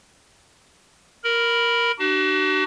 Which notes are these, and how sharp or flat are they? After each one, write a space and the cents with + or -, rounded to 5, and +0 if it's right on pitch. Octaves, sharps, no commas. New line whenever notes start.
A#4 +0 B5 -5
D4 +40 F#4 +40